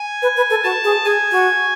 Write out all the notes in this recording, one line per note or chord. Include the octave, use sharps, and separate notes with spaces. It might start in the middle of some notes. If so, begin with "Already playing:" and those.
Already playing: G#5
B4
B4
A4
F#4 A5
G#4
G#4 G#5
F#4